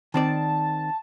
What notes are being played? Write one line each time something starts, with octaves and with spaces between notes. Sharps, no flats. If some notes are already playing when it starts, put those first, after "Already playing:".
D#3 C4 D5 A5